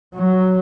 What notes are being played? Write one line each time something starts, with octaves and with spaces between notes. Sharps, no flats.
F#3